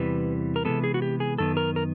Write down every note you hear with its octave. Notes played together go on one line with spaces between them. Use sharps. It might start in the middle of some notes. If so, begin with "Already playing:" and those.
Already playing: E2 C3 E3 G3 B4
A#4
C3 E3 G#3 B3 A4
G#4
F#4
G4
G#4
F#2 D#3 B3 A4
A#4
A#4